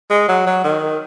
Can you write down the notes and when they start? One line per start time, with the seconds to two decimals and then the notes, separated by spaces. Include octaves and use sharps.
0.10 G#3
0.28 F#3
0.46 F#3
0.64 D#3